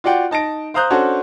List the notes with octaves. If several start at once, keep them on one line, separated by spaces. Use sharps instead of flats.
F4 F#4 D5 F#5 G5
D#4 A5 A#6 D7
C5 F5 A#5 D#6 F#6 G6
C#4 D4 F#4 A4 C5